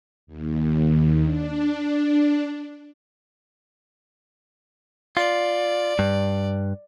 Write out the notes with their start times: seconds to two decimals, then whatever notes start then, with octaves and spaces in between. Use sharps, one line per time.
0.27 D#2
1.24 D4
5.17 F4 D5
5.99 G2